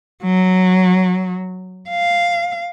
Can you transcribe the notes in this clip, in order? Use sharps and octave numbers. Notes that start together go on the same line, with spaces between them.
F#3
F5